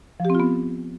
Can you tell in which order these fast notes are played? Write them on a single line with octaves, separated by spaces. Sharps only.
F3 G4 C4 F4 B3